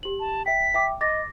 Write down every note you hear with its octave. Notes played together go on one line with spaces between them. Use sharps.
G4 F#7
A5
E5 G5 B6
E5 G5 D6
D#5 D6 A6 A#6